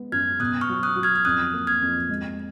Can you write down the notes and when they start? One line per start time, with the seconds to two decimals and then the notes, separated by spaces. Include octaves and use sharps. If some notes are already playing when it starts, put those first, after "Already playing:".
Already playing: G#3 B3
0.12 F#2 F6 G#6
0.40 B2 D#6 F#6
0.61 C#6 F6
0.69 F#3
0.83 D#6 F#6
0.96 F#3
1.03 F6 G#6
1.16 F6
1.25 F2 D#6 F#6
1.54 A#3
1.67 F6 G#6
1.82 F2
2.09 G#3